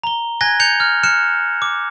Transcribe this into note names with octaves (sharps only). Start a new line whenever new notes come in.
A#5 G7
G#5 F#6 G#6 A#6 G7
G6 C#7 F7
F6
F6 F#6 C#7 E7
D6